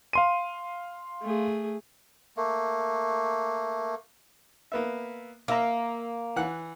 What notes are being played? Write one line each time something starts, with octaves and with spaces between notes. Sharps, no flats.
F5 C6 D#7
A3 G#4
A3 A#3
A#3 B3 E5
A#3 A#4 E5 A#5
E3 F#5 F#6